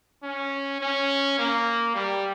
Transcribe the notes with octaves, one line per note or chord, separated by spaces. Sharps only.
C#4
C#4
A#3
G3